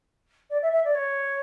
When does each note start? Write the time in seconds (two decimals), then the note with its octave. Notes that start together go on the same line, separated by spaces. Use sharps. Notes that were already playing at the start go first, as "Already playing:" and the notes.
0.50 D5
0.62 E5
0.72 E5
0.85 D5
0.95 C#5